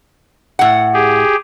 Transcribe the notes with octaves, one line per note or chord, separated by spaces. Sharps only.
A2 F#5
G4 G#4